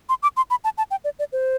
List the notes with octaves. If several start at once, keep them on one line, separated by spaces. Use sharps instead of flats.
C6
D6
C6
B5
A5
A5
G5
D5
D5
C5